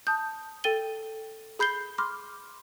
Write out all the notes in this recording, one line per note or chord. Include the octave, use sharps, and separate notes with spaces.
A5 D#6 G6
A4 G5 A6 D#7 G7
G#4 B5 G6 C7 G7
B5 C6 D6 F6